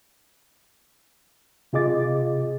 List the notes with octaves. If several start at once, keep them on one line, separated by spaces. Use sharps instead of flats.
C3 F4 G#4 D#5 D6 A6